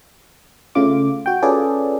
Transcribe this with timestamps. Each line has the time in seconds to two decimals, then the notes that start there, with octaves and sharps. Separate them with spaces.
0.75 C#3 A3 F4 D6
1.26 F#4 G5
1.42 C#4 F4 G#4 A4 B4 D5